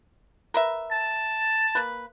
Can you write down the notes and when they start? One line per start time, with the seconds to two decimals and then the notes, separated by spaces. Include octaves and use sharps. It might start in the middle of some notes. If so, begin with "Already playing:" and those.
0.54 A#4 B4 E5
0.92 A5
1.75 A#3 B4